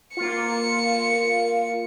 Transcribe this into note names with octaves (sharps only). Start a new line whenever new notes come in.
A#3 F4 C#7